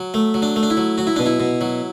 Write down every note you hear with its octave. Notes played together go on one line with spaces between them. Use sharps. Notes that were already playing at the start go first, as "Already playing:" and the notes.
Already playing: F#3
A3
F#3
D4
A3
D4
E4
F#3
F#3 F#4
E4
B2 D4
E4
B2
F#3